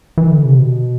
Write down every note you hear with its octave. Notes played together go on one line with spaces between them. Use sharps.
E3
D3
C3
B2